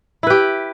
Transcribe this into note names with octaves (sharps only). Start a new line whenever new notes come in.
E4 G4 B4